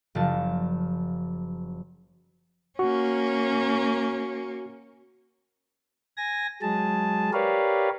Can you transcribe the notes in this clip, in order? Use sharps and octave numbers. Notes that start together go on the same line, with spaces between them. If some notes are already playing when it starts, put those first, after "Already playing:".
F#1 F3 F#3 A5
A#3 C#4 F#4
G#5 A#6
F#3 G#3 G#4 A5
G4 A#4 B4 C#5 D5 F5